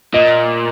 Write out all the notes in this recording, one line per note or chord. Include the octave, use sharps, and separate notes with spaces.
A#2 D#5